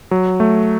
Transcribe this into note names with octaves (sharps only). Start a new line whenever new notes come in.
F#3
A3